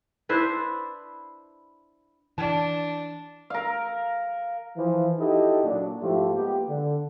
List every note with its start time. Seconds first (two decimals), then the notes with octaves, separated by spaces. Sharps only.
0.29 D4 E4 B4 C5
2.38 E3 D4 A5
3.50 A#4 F5
4.76 E3 F3
5.19 D#4 E4 F#4 G4 A4 D#5
5.64 A#2 F#3 D4
6.01 G#2 F3 A3 E4 F4 G4
6.34 G#3 A#3 B3 G4
6.68 D3